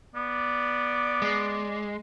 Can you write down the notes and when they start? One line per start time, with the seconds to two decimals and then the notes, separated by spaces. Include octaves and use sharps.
0.15 B3 D5
1.22 G#3